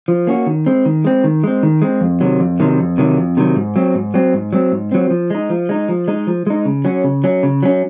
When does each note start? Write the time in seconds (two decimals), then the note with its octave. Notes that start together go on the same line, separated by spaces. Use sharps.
0.08 F3
0.27 A#3 C#4 F#4
0.47 D#3
0.66 G#3 C4
0.86 D#3
1.04 G#3 C4
1.24 D#3
1.44 G#3 C4
1.63 D#3
1.82 G#3 C4
2.01 F2
2.20 C3 D#3 F#3
2.40 F2
2.60 C3 D#3 F#3
2.79 F2
2.98 C3 D#3 F#3
3.17 F2
3.37 C3 D#3 F#3
3.56 G#2
3.76 F#3 C4
3.95 G#2
4.14 F#3 C4
4.34 G#2
4.53 F#3 C4
4.72 G#2
4.91 F#3 C4
5.10 F3
5.30 G#3 D#4
5.50 F3
5.69 G#3 D#4
5.89 F3
6.08 G#3 D#4
6.27 F3
6.47 G#3 D#4
6.65 C#3
6.85 F#3 C#4
7.04 C#3
7.24 F#3 C#4
7.43 C#3
7.63 F#3 C#4